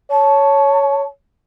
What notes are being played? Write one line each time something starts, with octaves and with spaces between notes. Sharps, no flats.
C#5 A5